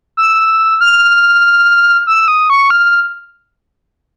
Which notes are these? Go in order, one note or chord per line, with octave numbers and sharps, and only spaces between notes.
E6
F6
E6
D#6
C#6
F6